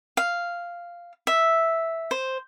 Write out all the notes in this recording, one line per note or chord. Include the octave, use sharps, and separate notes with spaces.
F5
E5
C5